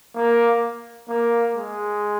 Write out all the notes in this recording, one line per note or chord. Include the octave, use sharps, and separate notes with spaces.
A#3
A#3
G#3